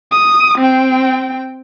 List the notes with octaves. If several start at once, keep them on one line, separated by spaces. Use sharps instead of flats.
D#6
C4 G5